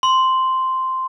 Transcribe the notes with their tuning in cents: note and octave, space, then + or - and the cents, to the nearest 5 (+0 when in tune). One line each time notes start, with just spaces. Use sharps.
C6 -5